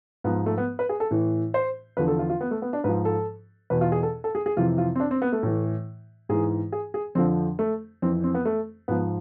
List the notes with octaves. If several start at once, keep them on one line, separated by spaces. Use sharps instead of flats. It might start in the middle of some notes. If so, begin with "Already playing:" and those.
G#2 F3 B3
A3
B3
B4
G#4
A4
A2 E3
C5
E2 D3 F3 B4
A4
F4
F4
B3
A3
B3
D4
G#2 F3 B4
A4
E2 B2 B4
F4
G#4
A4
A4
G#4
G#4
F2 C3 E3 F4
F4
C4
D4
C4
B3
A3
A2 E3
G#2 E3 G#4
G#4
G#4
F2 D3 F3 C4
A3
F2 E3 C4
C4
B3
A3
G#2 F3 B3